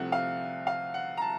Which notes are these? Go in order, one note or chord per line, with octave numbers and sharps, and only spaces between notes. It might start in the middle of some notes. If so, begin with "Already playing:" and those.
Already playing: C2 C3 F3 A3 C4 F#5
F5
F5
F#5
A#5
A5